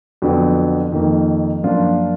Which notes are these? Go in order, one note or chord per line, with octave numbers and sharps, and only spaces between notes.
F2 D3 F#3 B3 D4
F2 D#3 A#3 D#4
F#2 F3 A#3 D4 F4